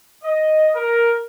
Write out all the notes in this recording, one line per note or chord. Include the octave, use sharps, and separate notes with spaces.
D#5
A#4